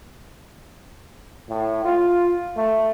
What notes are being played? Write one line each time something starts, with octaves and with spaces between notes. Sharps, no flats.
A2
F4
A3